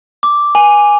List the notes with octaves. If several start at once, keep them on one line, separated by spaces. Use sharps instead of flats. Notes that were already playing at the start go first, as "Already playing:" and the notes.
D6
G#5